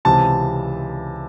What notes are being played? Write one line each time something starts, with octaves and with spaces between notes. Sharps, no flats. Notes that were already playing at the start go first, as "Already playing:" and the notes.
C#2 C3 E3 A5